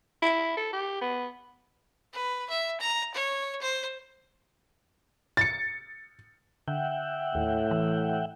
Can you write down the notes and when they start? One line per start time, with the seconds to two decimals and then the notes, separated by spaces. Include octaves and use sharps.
0.22 E4
0.57 A4
0.73 G4
1.01 B3
2.13 B4
2.50 E5
2.81 A#5
3.14 C#5
3.62 C5
5.37 A6 C#7
6.68 D3 E5 F#5 G5
7.35 D#2 A2
7.71 E3